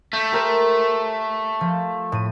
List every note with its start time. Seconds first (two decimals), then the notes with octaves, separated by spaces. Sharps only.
0.13 A3 G6 B6
0.32 G4 A#4 C5
1.61 F3
2.12 A2 D#7